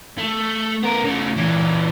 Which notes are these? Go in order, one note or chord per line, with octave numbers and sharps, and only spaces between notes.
A3
B3 A#4
C#3 A3
A#2 E3